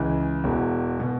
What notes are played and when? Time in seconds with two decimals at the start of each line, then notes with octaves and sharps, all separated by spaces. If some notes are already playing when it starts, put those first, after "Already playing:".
Already playing: C#2 C#3 E3
0.44 E1 E2 E3
1.00 B2